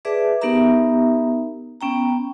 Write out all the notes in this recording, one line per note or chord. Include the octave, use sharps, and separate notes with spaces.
G#4 B4 D5 E5 A5 D6
B3 D#4 G4 A#4 E5 A#5
B3 C#4 G5 A#5